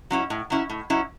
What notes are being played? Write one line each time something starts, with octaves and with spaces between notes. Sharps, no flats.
F#3 C#4 E4
A2
F#3 C#4 E4
A2
F#3 C#4 E4